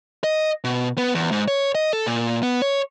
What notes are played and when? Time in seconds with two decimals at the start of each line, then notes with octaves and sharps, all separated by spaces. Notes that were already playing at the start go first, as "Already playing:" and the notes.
0.24 D#5
0.64 B2
0.98 B3
1.15 E2
1.32 G#2
1.48 C#5
1.75 D#5
1.93 A4
2.06 A#2
2.43 B3
2.62 C#5